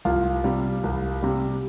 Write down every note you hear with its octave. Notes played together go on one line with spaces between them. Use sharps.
C2 F4 F5
C3 G3
C2
C3 G3